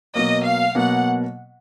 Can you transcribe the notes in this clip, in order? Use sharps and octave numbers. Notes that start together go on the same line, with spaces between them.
B2 F#3 A#3 D#5
F5
B2 F#3 A#3 F#5